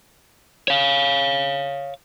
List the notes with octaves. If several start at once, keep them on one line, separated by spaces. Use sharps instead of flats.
C#5 F5